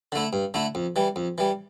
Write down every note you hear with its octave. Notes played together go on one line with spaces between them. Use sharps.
D3 A3 E4
G2
D3 A3 E4
F2
E3 G3
F2
E3 G3